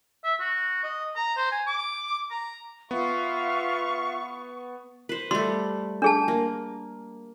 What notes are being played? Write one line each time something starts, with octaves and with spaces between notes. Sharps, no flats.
E5
F#4
D#5
A#5
C5
G#5
D6
A#5
B3 F4 E5 F5 C#6
B4 C5
G3 A3 C6
D4 G#4 A5
A#3